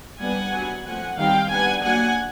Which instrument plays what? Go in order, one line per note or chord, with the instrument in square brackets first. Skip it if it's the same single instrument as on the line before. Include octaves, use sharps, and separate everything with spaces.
[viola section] G3 B3 D4 F#5 G#5
F#3 B3 D4
F3 A3 C4 F#5 G#5
D#3 G3 C4 F5 G5
G3 B3 D4 F#5 G#5
F#3 A#3 D4 F#5 G#5